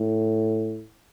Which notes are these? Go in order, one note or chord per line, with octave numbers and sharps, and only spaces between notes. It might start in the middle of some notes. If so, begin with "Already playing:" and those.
Already playing: A2